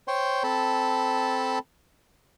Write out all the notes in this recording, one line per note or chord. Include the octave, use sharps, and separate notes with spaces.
C5 C#5 G5 C6
C4 A4 A5 B5